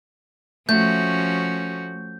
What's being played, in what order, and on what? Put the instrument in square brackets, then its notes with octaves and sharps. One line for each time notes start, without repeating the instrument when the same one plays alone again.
[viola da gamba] F3 C#4 F#4 [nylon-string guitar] A3 [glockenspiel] G6